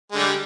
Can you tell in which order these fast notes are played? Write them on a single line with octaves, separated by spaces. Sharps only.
G#3 D3 G3